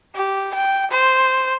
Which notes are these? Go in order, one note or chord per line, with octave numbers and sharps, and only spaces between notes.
G4
G5
C5